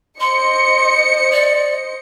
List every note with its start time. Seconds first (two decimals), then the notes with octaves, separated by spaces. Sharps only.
0.20 C5 D#5 C6 C#7
1.32 D5